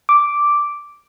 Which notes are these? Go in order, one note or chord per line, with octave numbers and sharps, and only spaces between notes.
D6